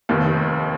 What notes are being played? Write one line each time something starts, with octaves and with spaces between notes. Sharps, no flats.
F1 D#2 D#3